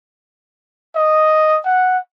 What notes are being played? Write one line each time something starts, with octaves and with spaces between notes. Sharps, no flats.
D#5
F#5